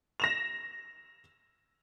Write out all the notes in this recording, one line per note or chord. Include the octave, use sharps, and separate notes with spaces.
A#6 E7 F7